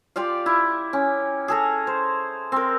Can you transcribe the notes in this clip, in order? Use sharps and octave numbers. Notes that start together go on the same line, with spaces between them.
F4 G4 D5 F5
E4
C#4
G#4 A4 A#5
C5
C4 A#4